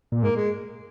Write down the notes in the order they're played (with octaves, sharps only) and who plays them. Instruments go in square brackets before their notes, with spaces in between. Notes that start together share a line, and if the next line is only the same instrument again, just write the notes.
[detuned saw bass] A#2
[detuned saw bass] G#2 [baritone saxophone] A#3
[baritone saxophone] G#3